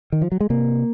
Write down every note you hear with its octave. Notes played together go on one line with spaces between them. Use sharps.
D#3
F3
F#3
G#3
C3 A#3